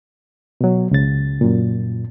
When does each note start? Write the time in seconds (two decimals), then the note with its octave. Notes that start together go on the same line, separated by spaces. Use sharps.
0.61 B2 F#3
0.91 C#2 C#3 A6
1.41 F#2 A#2